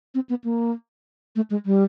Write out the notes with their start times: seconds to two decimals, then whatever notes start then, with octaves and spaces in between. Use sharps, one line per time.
0.15 C4
0.29 B3
0.44 A#3
1.36 A3
1.50 G#3
1.66 G3